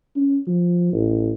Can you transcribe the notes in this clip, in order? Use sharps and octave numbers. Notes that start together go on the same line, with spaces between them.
C#4
F3
A1